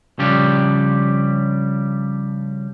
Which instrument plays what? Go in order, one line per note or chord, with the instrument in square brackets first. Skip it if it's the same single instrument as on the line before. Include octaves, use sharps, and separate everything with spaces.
[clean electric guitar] C#3 F3 G3 D4 G4